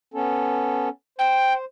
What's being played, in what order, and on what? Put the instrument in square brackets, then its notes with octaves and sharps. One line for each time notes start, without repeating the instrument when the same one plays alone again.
[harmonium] B3 C#4 A4
[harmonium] C5 [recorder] G5